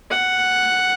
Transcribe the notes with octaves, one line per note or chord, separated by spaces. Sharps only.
F#5